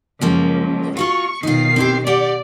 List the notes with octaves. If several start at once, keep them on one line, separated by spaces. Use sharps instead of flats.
C#2 F#2 F3 A#3
F4 F#4 F5 C#6
B1 D#3 D#4 F4 C7
C4 E4 G4
G4 D5 F#5